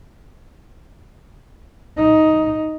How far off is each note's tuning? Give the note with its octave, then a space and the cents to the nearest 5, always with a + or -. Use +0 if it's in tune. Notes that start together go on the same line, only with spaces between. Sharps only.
D#4 +10